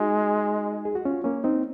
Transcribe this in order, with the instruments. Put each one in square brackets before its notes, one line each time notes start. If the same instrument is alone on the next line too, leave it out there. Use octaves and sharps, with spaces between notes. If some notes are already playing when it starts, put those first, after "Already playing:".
Already playing: [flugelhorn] G#3 [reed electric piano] D#4 F#4
[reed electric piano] G#4
F#4
C#4 F4
A#3 C#4
C4 D#4